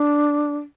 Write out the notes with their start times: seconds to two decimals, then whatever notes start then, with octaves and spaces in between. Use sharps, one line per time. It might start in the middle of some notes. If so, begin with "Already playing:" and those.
Already playing: D4